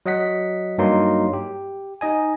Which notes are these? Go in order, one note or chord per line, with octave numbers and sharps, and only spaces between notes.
F#3 D#5 F#5 B6
G2 F#3 A#3 D#4 C6
G4
D#4 D#5 G#5